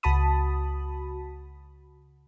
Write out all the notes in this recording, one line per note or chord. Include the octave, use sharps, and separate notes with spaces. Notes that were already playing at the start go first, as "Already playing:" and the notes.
C#2 F#4 A5 B5 D#6